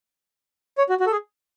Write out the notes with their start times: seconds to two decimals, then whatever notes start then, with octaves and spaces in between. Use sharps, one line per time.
0.78 C#5
0.89 F#4
1.00 F#4
1.07 A4
1.12 G#4